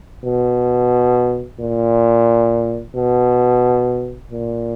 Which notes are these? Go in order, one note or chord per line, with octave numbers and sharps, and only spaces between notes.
B2
A#2
B2
A#2